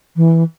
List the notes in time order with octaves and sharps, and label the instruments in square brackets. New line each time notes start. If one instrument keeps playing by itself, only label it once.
[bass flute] E3